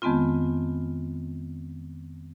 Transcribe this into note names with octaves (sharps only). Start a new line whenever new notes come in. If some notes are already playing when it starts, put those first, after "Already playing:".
F2 D#3 G#3 B3 C4 F4